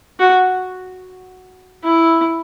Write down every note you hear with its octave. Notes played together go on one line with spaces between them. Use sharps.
F#4
E4